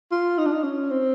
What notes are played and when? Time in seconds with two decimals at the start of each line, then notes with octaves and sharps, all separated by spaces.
0.12 F4
0.38 D#4
0.46 D4
0.52 D#4
0.64 C#4
0.91 C4